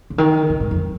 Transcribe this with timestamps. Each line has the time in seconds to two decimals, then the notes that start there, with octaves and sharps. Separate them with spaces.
0.10 C#3
0.18 D#3
0.50 C#3
0.60 G#2
0.71 F2